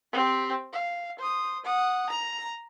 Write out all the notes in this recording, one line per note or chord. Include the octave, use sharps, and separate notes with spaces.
C4 G4
F5
C5 D#6
F#5 D#6
A#5